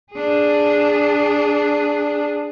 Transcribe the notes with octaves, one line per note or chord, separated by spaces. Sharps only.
D4 G#4